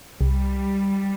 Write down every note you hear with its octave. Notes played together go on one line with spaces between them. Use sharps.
C2 G3